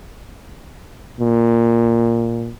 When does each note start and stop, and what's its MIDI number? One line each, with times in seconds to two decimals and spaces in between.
1.20 2.52 46